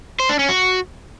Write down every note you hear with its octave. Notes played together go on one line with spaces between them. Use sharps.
C5
D4
C#4
F#4